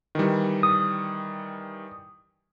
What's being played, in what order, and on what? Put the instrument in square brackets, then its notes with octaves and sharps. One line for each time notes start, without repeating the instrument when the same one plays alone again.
[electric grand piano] D#3 E3 G3
[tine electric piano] D#6